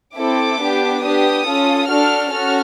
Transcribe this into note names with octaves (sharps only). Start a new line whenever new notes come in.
C4 E4 A4 D6
B3 D4 G4
B3 D4 G4 D#6
C#4 F4 A4
D4 F#4 A4 F6
C#4 F#4 A4 F6